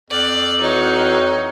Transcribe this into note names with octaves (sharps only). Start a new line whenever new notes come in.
F2 D5
E3 D#4 F#4 C#5